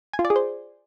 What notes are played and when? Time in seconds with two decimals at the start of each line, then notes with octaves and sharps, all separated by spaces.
0.13 G#5
0.19 F4
0.25 D5
0.30 G#4
0.36 C5